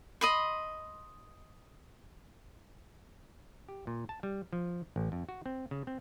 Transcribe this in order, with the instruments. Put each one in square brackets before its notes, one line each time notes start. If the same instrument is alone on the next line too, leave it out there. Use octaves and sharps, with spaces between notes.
[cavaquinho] D#5 B5 C6
[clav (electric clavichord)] G4
A#2
A5
G3
F3
A1
F2
F#4
C4
C#3
C4